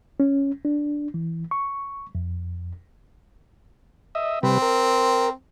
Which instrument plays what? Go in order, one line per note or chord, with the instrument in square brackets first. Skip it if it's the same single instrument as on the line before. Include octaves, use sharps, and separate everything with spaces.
[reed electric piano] C#4
D4
E3
C#6
F2
[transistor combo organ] D#5 E5
[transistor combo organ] C3 G3 B4 [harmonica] C4
[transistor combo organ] A#4